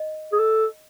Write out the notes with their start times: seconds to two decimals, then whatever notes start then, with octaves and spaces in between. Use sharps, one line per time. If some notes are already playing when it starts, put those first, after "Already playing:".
Already playing: D#5
0.32 G#4
0.39 A4